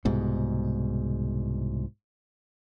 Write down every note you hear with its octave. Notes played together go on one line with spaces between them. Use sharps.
C2 G#2 B2